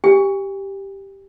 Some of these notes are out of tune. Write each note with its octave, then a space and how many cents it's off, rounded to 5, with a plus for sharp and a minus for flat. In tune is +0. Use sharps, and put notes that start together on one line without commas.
G4 +0 G#5 -40